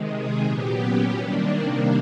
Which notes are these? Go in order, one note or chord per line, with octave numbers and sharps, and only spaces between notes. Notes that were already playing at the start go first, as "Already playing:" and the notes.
Already playing: C3 D#3 G#3
G#4
A#2 F#3 B3 G4
C#4
C3 D#3 G3 A#3 D4